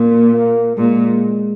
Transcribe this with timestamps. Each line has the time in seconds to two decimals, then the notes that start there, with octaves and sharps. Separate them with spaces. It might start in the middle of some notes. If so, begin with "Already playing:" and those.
Already playing: A#2 A#3
0.33 A#3
0.77 A#2 G#3